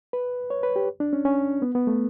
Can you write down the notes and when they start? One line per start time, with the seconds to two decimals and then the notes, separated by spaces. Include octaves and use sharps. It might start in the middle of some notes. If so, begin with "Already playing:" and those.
0.13 B4
0.50 C#5
0.63 B4
0.76 G4
1.00 D4
1.13 C#4
1.25 C#4
1.62 B3
1.75 B3
1.87 A3